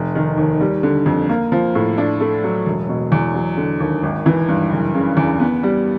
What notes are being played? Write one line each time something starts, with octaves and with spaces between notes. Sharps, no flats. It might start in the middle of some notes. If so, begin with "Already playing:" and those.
Already playing: F1
D#3
D#2
G3
D3
F2
A#3
F3
A2
D4
A3
F#3
E1
B2
E2
F#3
D3
D#2
G#1
E3
G2
F#1
C#3
E2
B3
G3